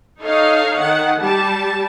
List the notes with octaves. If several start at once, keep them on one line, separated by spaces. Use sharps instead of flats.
D#4 A4 C#5 D#5 F5
D#3 F#5
G3 A5